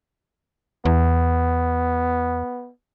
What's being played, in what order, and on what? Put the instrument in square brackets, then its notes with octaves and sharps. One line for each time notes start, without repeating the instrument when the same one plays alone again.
[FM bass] E2 [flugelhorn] B3